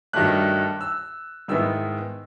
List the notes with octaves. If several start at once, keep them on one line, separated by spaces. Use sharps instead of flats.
G2 D#3 F#3 A3 D4 F#6
E6
G#2 D#3 G#3 B3 E4 E6